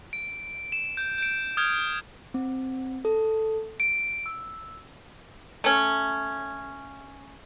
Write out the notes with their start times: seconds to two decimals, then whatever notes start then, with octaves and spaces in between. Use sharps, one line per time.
0.13 D7
0.72 E7
0.97 G6
1.18 G6 D7
1.57 D#6 F6 G6 G#6
2.34 C4
3.05 A4
3.80 D7
4.26 E6
5.64 A3 C#4